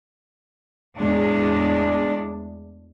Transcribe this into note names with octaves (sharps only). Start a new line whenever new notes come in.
E2 A2 G#3 D4